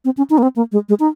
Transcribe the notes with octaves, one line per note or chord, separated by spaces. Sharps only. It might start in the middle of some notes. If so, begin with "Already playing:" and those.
C4
C#4
D#4
A#3
C4
A#3
G#3
G#3
D#4